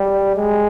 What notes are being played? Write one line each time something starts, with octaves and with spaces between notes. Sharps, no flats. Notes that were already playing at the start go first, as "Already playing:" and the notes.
Already playing: G3
G#3